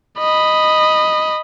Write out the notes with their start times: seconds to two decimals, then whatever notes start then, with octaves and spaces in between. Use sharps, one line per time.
0.18 D#5 B5